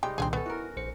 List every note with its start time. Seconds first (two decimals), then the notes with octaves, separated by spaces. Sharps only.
0.03 C3 G3 G#3 D#4 G5 C6
0.18 C2 A#2 D#3 C4 D4 G#4
0.33 B3 C#4 A4
0.46 E4 F#4 A#4
0.77 A#1 C5 C#7